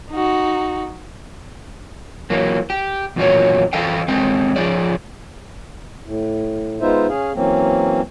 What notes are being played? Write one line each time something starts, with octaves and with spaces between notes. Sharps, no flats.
D#4 F#4
E3 F#3 A#3
G4
E2 A#2 D#3 F#3 F#4 C#5
E3 A4 D#5 F5 G5
E2 G#3 C4 A4 G5
F3 D#4 G#4 D5
A2
G#3 B3 D#4 F4 C5 E5
C#4 G#4 F5
E3 F#3 A#3 C4 C#4